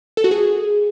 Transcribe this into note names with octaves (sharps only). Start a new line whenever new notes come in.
A4
F#4
G#4